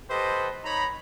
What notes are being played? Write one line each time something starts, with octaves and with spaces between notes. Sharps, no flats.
G4 A4 B4 C5 D#5
D#4 C#5 A#5 B5